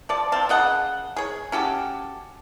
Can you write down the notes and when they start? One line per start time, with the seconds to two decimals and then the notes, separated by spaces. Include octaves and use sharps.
0.09 F3 D5 A5
0.32 C4 F5 A5
0.49 C#3 D#5 F#5
1.16 G#4 C#5
1.52 C#4 F#4 G4 A4